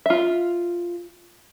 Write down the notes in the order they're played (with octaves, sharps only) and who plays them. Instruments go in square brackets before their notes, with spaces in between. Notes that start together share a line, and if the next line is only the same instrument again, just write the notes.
[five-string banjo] F4 E5